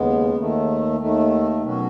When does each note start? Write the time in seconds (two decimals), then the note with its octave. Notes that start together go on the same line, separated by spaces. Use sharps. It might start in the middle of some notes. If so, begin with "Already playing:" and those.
Already playing: D#2 C#3 G#3 B3
0.36 D#2 D#3 A3
0.99 D#2 D#3 A3
1.62 B2 F#3 C#4 F#4